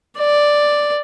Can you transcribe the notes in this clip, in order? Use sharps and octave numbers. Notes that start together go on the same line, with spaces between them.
D5